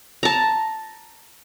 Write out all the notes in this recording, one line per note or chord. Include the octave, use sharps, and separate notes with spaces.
A5 A#5